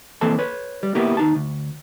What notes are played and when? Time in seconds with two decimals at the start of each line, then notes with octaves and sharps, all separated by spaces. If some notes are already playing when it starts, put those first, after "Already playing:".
0.21 E3 A#3 C4 A4 A5
0.39 B4 C#5
0.83 G3
0.95 A#3 B3 E4 G4 A#4
1.17 D#2 D#4 A5
1.35 D2